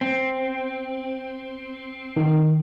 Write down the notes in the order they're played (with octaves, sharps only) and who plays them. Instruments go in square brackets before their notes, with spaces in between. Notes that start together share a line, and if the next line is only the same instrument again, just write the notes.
[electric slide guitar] C4
[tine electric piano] D#3